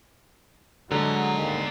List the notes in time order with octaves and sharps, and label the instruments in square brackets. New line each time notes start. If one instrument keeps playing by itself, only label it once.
[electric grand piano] D3 [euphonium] F#3 [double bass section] G#3 [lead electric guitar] D5 A#5
[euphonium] D#2